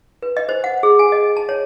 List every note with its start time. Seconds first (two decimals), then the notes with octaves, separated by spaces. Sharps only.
0.22 B4
0.37 D#5
0.49 C5
0.64 F#5
0.83 G#4
0.99 G#5
1.12 D#5
1.37 A5
1.49 C#5